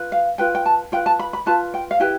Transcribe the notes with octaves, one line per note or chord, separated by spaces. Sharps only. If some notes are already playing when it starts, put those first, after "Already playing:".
Already playing: F4 B4
F5
F4 B4 G5
G5
A5
F4 B4 G5
A5
B5
B5
F4 B4 A5
G5
F5
E4 G4 B4 G5